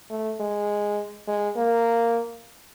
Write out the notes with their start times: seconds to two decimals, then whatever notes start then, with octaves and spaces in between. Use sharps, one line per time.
0.10 A3
0.40 G#3
1.28 G#3
1.57 A#3